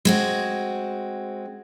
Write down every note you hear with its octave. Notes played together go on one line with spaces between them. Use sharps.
G#3 C4 F#4